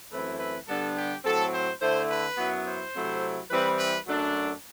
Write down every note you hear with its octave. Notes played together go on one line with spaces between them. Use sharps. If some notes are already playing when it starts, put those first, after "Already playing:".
F#2 E3 A3 C4 E4 B4
B4
D3 G3 B3 D4 A4
G4
A2 F#3 C4 A4
C5
D3 A3 E4 C5
B4
F#2 F#3 B3 E4
C5
C3 F#3 A3 C4 E4
E3 G3 C4 E4 B4
B4
F#2 F#3 A3 D4